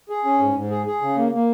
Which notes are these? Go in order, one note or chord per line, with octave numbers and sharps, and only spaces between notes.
G#4
C#4
G#2
G#2
G#4
G#4
C#3
A#3
A#3